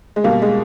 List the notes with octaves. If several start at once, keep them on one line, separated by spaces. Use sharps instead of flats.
G#3
B2 G3 A#3
G#3